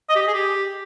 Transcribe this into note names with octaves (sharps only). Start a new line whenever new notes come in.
D#5
G4
D#5
G#4
G4